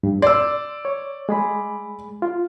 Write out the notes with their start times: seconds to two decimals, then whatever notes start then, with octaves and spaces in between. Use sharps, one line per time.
0.03 G2
0.22 D5 C6 E6
0.85 C#5
1.29 G#3 G#4 B5
2.22 F4